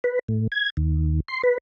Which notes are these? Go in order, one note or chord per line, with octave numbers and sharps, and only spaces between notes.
B4
A2
G#6
D#2
C6
B4